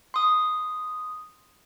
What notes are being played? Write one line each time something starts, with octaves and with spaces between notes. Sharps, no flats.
C6 D#6